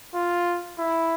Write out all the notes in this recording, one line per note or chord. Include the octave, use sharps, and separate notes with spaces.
F4
E4